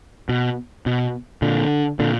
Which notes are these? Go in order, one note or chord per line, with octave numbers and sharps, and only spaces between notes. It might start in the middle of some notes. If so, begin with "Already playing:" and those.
B2
B2
A#2 D3
A#2 D3